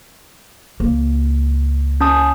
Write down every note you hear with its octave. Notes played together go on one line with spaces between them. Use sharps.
C#2 A#3
C#4 A5 D#6